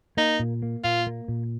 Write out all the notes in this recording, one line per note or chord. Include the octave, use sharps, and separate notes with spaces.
A#3 D#4
A#2
A#3
A#2 F4
A#3
A#2